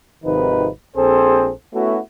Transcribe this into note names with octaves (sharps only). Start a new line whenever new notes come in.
G#1 C3 D#3 F3 D#4 B4
A#1 C4 G#4 A4 C5
A3 B3 C#4 E4 F#4